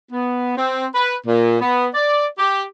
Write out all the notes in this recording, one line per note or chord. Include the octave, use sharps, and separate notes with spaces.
B3
C4
B4
A#2
B3
D5
G4